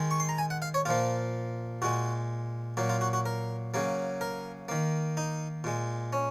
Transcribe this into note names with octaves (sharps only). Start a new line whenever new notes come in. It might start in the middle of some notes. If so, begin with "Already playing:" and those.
Already playing: D#3 G#3
C#6
C6
A#5
G#5
F#5
F5
C#5
A#2 F3 A#3 F4
A#2 G#3 F#4
A#2 F#3 A#3
F4
F#4
F#4
A#4
C#3 F#3 A#3
A#4
D#3 A#3
D#4
A#2 G#3
C#4